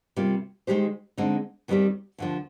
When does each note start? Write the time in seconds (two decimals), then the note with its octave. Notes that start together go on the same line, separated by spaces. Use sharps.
0.16 C3 G3 A#3 F4
0.67 D#3 G#3 D#4 G4 C5
1.18 D3 G#3 C4 D#4
1.68 D#2 D#3 G3 C4 G4
2.18 D#2 D3 F3